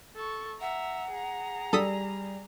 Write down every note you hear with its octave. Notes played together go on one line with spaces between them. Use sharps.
A4 C#6
E5 F#5 A#5
G#4 A#5
G3 A4 D#6 B6